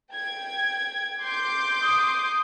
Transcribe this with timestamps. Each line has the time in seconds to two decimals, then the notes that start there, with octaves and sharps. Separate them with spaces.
0.15 G5 G#6
1.22 C6 D6 G6
1.83 D#6